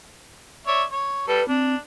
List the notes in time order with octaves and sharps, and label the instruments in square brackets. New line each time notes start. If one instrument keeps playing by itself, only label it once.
[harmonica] C#5 D5 E5
C#5
[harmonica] G3 A4 [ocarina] B4
[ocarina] C4 [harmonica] D4